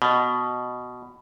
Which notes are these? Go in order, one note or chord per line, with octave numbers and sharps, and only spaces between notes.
B2